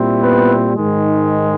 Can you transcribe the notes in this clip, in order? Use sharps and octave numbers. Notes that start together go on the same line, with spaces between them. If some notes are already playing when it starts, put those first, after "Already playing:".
Already playing: A#2 G3 C4 E4
B3 B4
G#2 D#3 G#3